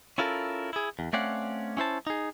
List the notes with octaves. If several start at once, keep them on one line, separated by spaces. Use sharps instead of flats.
C#4 E4 F4 A4 A#4
E4 G#4
E2
A3 C4 C#4 D5 F5 F#5
C#4 E4 C5 A5
D#4 G#4